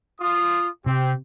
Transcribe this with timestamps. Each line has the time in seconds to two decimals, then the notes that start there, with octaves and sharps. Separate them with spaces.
0.20 F4 D#6
0.86 C3 C4 G4